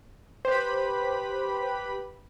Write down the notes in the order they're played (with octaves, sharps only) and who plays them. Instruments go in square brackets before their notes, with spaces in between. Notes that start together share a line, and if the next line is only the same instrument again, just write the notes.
[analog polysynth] G4 B4 B5 [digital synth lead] C5